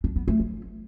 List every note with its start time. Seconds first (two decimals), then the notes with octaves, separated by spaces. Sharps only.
0.04 D4
0.16 B3
0.28 A3
0.39 F3